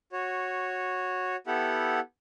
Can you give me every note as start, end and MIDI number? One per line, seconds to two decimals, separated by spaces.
0.12 1.36 66
0.12 1.36 73
1.47 2.00 59
1.47 2.00 64
1.47 2.00 67
1.47 2.00 69
1.47 2.00 76
1.47 2.00 78